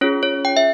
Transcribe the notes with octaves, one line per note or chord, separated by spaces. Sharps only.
C#4 F4 G#4 C#5
C#5
G5
E5